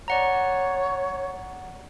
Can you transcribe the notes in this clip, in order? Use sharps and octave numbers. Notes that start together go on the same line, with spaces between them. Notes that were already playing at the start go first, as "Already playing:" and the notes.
C#5 D5 F#5 A#5